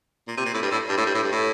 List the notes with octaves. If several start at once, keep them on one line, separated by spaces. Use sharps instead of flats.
A#2
C3
A#2
A2
G2
A2
G2
A2
G2
A2
G2
A2